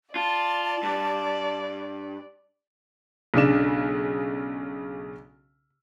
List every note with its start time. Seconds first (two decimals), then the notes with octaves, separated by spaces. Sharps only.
0.16 F4 D5 A5
0.83 G2
3.34 B1 C#3 D4 E7